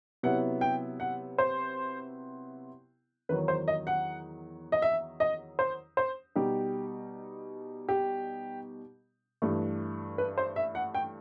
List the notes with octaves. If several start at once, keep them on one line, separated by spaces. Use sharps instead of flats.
C3 F#3 B3 E4 F#5
G5
F#5
C5
E2 D#3 F#3 B4
C5
D#5
F#5
D#5
E5
D#5
C5
C5
B2 G3 D#4 G4
G4
G2 E3 A3
B4
C5
E5
F#5
G5